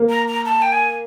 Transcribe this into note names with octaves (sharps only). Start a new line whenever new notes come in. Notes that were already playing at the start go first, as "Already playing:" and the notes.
Already playing: A#3
A#5
A#5
A5
G5
G#5